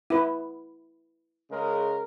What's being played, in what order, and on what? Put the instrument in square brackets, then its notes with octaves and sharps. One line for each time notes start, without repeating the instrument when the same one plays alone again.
[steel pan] E4 B4
[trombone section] C#3 G#3 A#4